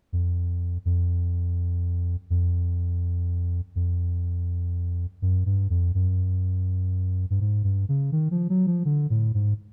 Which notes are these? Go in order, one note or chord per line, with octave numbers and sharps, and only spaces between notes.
F2
F2
F2
F2
F#2
G2
F2
F#2
G2
G#2
G2
C#3
D#3
F3
F#3
F3
D3
A2
G#2